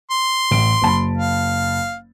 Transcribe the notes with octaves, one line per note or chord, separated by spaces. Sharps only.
C6
A1 D7
F#1 A5 B5
F5